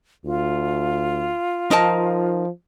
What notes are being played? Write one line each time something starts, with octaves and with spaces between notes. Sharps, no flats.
D2 F4
F3 D#4 A#4 A5